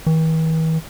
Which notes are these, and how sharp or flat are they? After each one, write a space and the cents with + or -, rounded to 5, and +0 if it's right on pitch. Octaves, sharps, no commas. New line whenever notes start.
E3 -45